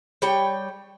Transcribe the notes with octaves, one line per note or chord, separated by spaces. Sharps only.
G3 C#5 G5